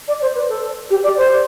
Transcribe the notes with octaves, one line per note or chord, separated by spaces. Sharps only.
D5
C5
B4
A4
G4
D5
C5